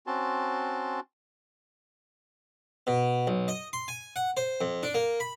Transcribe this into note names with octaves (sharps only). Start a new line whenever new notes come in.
C4 C#4 F#4 A5 C6
B2
B1
D#5
C6
G#5
F#5
C5
F2
D4
A#3
B5